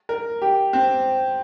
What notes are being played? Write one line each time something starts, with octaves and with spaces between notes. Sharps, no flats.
A#4
G4
C4